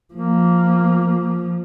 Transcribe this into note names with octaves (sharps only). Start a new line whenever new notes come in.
F3 A#3